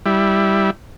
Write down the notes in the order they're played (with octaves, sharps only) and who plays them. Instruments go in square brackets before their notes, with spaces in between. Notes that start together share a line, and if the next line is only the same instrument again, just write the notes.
[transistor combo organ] G3 E4